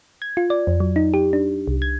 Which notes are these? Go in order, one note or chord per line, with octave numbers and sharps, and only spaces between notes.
G#6
F4
D5
F2
F#3
D#4
G4
D4
C2
G#6